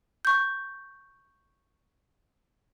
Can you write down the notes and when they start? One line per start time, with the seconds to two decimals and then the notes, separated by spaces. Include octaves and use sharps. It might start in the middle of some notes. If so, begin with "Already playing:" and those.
0.25 C#6 G6